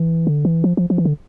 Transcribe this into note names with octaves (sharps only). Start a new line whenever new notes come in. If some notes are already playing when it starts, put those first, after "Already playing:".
Already playing: E3
D3
E3
F3
F3
F3
E3
D3